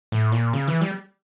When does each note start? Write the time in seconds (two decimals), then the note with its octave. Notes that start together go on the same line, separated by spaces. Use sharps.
0.12 A2
0.32 A#2
0.53 C#3
0.68 E3
0.81 G3